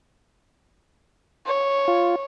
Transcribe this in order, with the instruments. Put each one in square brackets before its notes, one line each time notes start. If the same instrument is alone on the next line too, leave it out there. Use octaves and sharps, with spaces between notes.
[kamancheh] C#5
[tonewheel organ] F4